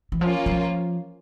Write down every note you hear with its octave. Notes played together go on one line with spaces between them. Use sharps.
E3
F3 A#3 C#4 F4
F#3
F3